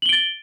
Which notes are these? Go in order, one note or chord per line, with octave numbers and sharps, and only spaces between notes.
A6 D7 F#7 G7